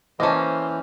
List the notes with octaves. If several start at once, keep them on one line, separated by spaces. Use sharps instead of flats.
E3 A#3 C#4 C5 D#5 A5